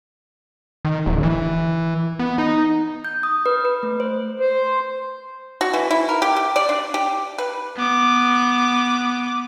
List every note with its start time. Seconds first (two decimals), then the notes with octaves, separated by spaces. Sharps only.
0.85 D#3
1.06 D1
1.23 E3
2.19 B3
2.38 D#4
3.05 G6
3.23 D#6
3.46 B4
3.65 B4
3.83 A3
4.00 C5
4.40 C5
5.61 F#4
5.74 E3
5.91 E4
6.09 A#4
6.22 G4
6.36 G4
6.56 D5
6.69 D4
6.94 G4
7.38 B4
7.76 B3 D6